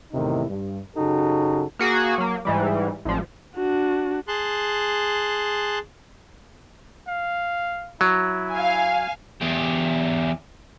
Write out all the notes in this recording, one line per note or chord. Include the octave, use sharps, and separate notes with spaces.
E2 A2 C3 D#3 D#4 E4
G2
F#2 C#3 D#4 F#4 G4 A4
A#3 F#4 G#4
F#3 A#3
G#2 E3 G3
A1 F3
D4 F#4
G#4 A5 C6 F#6
F5
F#3 E4
F5 G#5
E2 G4